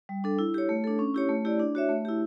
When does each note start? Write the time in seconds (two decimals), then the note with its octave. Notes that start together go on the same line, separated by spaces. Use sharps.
0.09 G3
0.24 D4 A4
0.39 E4
0.54 G4 C#5
0.69 A3
0.84 D4 A4
0.99 C#4
1.14 E4 G4 C#5
1.29 A3
1.45 E4 G4 D5
1.60 D4
1.75 F#4 C#5 E5
1.89 A3
2.05 E4 G4